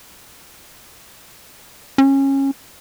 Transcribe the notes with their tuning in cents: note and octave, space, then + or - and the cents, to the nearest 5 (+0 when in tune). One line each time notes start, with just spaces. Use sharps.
C#4 -20